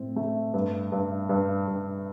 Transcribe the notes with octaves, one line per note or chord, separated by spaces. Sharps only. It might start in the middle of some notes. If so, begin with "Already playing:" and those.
Already playing: A2 C4
A3
G2
G2
G2
G2